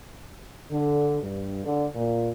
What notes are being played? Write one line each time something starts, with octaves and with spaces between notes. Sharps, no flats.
D3
G2
D3
A#2